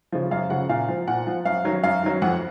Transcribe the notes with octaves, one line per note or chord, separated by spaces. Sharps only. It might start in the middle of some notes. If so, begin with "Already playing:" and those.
C#3 F3
F#2 F5
C#3 F3 F#5
A#2 F5
F3
A#2 F#5
F3
F#2 F5
D#3 F#3
F#2 F5
D#3 F#3
F2 F#5